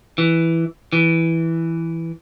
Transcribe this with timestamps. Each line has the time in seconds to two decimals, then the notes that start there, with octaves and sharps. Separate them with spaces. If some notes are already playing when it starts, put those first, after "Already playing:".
0.18 E3
0.93 E3